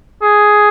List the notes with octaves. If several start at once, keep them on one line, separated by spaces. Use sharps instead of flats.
G#4